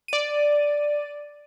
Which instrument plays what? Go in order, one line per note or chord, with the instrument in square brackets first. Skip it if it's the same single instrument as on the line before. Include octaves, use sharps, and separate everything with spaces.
[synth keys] D5 D#7